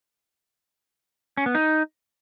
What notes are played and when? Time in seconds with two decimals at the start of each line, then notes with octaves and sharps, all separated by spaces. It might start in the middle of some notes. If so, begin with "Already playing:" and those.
1.37 C#4
1.46 B3
1.55 D#4